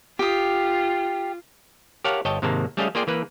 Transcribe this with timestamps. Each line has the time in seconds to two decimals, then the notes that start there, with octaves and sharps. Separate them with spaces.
0.19 F4 G4 D#6
2.04 G4 A#4 C#5 F5 F#5 A5
2.25 G1 C#5 D#5 G5 A5
2.42 G#2 C3 D#3 A#3 A5
2.77 G3 A3 C#4 G#4 D#5 F5
2.95 A#3 F4 G#4 D5 G5
3.07 E3 A#3 B4